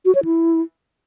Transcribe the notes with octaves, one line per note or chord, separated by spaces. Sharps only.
F#4
C#5
E4